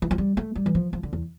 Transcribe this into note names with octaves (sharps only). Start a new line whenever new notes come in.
E3
F3
G3
A3
G3
E3
F3
F3
D3
E2